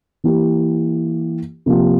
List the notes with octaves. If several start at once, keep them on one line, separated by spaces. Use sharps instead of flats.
E3 A#3 E4 G4
C3 F3 A#3 F4